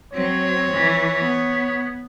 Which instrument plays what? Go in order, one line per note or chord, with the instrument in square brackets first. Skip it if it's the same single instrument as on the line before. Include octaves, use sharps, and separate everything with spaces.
[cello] F#3 C4 [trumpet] C#5
[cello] E3
B3